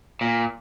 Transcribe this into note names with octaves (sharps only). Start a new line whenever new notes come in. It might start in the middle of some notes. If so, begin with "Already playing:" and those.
A#2